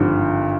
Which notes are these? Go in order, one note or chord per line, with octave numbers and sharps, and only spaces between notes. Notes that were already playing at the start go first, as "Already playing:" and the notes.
Already playing: G#1 G2 D3 F3